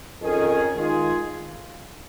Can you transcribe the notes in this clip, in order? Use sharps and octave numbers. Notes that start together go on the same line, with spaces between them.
F2 D#3 C#4 G#4
D#3 G#3 F4 G#4